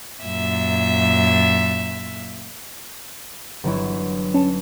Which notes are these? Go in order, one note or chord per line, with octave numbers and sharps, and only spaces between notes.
F#2 A#2 E5
G1 F#3 E4
C#4 A5